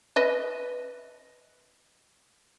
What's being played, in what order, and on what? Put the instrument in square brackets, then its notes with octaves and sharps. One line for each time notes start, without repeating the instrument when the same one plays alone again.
[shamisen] B4 D#5 E5